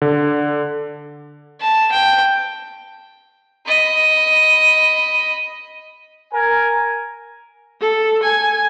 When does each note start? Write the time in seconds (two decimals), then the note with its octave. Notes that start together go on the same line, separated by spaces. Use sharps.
0.02 D3
1.60 A5
1.92 G5
3.66 D#5 B5
6.32 A#4 G#5
7.81 A4
8.22 G#5